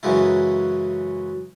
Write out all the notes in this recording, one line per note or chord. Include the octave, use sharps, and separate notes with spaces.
F#2 C#3 E3 F#3 G#3 E4